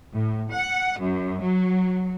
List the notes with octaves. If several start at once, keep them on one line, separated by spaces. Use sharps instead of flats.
A2
F#5
F#2
F#3